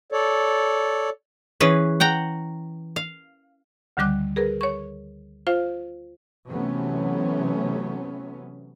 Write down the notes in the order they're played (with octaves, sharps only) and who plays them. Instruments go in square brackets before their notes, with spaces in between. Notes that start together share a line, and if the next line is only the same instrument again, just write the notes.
[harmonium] A4 C#5 D5
[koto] E3 C#4 G#4 B4
F#5 G5 A#5
F5
[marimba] D2 D3 D#3 G3 D6 F#6
G#4 A#4 B4
C#5 C#6
F4 C5 F5
[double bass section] C3 E3 F#3 A3 B3 C#4